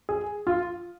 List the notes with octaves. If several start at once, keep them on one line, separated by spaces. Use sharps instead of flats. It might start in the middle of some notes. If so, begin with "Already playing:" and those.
G#4
F4